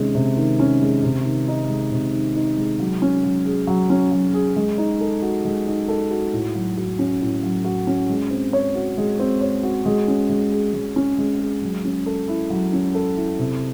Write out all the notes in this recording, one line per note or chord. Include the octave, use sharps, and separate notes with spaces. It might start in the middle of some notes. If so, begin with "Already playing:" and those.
Already playing: C3 D#3 G#3 C#4
C3
D#3
C#4
G#3
C3
D#3
D#4
G#3
C3
D#3
D#4
G#3
F#3
C#4
F#3
G#4
F#3
C#4
F#3
G#4
G#3
D#4
A4
F#4
G#3
D#4
A4
F#4
A2
F#3
F#4
C#4
A2
F#3
F#4
C#4
G#3
C4
C#5
F#4
G#3
C4
C#5
F#4
G#3
C#4
G#3
G#4
G#3
C#4
G#3
G#4
F#3
C#4
A4
E4
F#3
C#4
A4
E4
C3